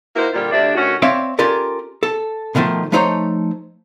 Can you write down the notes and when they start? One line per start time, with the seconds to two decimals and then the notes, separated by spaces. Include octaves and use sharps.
0.15 A#3 D#4 E4 F#4 C5
0.33 A#2 D3 G3 F4 G4
0.50 D2 C3 D4 D5 E5
0.75 D2 D#3 C#4 F#4
1.02 C4 C#5 D5 E5 F5
1.39 C#4 F4 G4 A4 A#4 D5
2.03 A4
2.55 B2 D3 D#3 F3 A3
2.92 F3 A3 D#4 C5 C#5 A#5